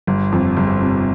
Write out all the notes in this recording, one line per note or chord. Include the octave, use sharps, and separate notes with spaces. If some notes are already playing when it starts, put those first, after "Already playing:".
G1
F2
G1
C3